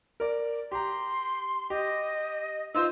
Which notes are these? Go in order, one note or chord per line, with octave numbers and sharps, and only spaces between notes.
A#4 D5
G4 A#5 C6
G4 D#5
D#4 F4 C5 E6